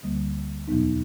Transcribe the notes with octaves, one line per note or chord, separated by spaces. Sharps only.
D2 D3 G3 A#3
E2 B2 F#3 B3 D#4